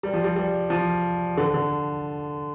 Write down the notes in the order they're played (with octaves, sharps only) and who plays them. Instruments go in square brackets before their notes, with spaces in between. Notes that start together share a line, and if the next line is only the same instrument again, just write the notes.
[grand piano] G3
F3
G3
G3
F3
D3
D3